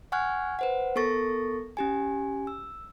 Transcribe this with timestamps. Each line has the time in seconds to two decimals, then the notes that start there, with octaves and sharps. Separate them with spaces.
0.12 F#5 G#5 C#6 F6 F#6 G#6
0.59 B4 C5 F#5
0.96 B3 A4 A#4 C#6 A6 A#6
1.77 C#4 G4 G#5
2.47 E6